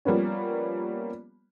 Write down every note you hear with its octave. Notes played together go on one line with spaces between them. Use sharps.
F3 G3 A#3 B3 C#4